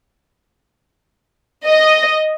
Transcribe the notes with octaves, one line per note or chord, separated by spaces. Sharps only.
D#5